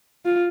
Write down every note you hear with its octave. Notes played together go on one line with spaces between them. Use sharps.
F4